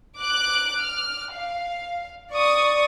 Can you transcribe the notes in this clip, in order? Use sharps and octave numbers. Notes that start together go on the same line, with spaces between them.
D6 F#6 D7
F6
F5
D5 C#6 D#6